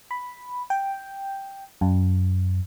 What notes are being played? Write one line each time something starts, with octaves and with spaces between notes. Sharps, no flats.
B5
G5
F#2